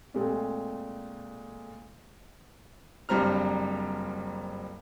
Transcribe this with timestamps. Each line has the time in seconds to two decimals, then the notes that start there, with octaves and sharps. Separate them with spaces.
0.14 A#2 G#3 A3 C4
3.09 F#1 G2 G3 C4 A#5 F6